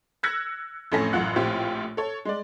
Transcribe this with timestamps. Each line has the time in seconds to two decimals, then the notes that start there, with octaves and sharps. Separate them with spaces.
0.23 E6 F#6 G#6 A#6 C#7
0.92 A1 F2 A3 C#4 G#5 A#6
1.13 A1 F#2 F4 F#5 F#6
1.36 A#1 A2 C4 F4 G4
1.97 A4 C#5
2.25 G#3 D5